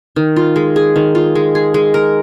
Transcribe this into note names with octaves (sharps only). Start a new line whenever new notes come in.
D#3
F4
G#3
G#4
D#3
F4
G#3
G#4
G#3
A#4